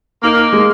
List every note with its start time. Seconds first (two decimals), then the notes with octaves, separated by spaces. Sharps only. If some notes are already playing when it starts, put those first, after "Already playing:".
0.23 A#3 D#4
0.53 G#3